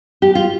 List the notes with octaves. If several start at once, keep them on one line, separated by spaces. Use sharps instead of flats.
G4
F4